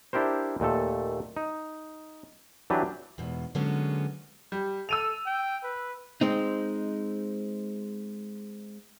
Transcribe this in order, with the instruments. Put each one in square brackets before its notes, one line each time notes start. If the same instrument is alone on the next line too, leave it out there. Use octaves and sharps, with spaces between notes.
[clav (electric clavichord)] D4 E4 G4 A#4 C5
D#2 A#2 A3 A4
D#4
E3 F#3 D4 G4 B4
[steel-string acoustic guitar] E2 G#2 B2
D3 F#3 G#3 A#3 B3 C#4
[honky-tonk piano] G3
[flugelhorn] A4 [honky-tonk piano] E6 D#7 F7
[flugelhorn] G5
B4
[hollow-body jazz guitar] G#3 C4 D#4